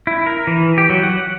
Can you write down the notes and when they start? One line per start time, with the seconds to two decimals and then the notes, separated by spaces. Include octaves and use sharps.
0.07 E4
0.26 A#4
0.47 E3
0.78 G4
0.90 F#3
1.04 F#5